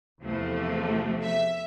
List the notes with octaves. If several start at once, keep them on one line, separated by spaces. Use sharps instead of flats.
E2 C3 F3 A3
E5